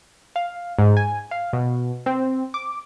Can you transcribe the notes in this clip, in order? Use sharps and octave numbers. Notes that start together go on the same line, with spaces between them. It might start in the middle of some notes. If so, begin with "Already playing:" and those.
F5
G#2
G#5
F5
B2
C4
D6